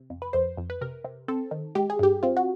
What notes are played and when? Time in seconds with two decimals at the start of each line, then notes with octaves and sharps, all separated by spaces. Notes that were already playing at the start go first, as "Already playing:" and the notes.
Already playing: C3
0.10 F2
0.22 B4
0.33 F2 C5
0.57 F2
0.70 B4
0.81 C3 A#4
1.04 C3
1.28 C4 A4
1.51 D#3
1.75 G#3 G4
1.90 G#4
1.99 G2 G4
2.23 C4 F4
2.37 F#4